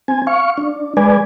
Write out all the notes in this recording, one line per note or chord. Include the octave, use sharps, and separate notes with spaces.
C4 G#5
F5 C#6
D4
G#3 B4 D5 G#5